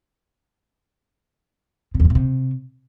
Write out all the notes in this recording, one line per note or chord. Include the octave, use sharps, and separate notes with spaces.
C3
E2
A#2
B2
C3